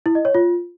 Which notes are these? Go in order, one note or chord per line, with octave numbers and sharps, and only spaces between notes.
E4
D#5
C#5
F4